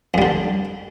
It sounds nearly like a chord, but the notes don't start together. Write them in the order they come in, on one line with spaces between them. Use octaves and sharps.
F2 G3 D3